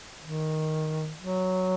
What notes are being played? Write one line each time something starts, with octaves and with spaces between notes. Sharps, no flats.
D#3
F#3